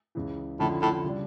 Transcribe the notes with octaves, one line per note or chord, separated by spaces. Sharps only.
C#2 C#3 E3
F2 A2 D3 F3 C#4 E4
A2
C#3 G3 D4